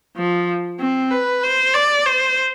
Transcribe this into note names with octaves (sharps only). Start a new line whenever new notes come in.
F3
C4
B4
C5
D5
C5